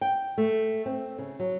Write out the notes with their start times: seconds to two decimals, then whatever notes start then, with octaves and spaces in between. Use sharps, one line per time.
0.01 G5
0.38 A3
0.86 C4
1.19 C#3
1.40 F#3